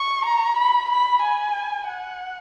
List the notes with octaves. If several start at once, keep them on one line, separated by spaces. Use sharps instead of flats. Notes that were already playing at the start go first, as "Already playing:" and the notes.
Already playing: C#6
A#5
B5
B5
G#5
F#5